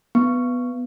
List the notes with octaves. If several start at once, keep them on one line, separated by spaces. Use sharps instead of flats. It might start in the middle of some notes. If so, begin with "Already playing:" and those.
B3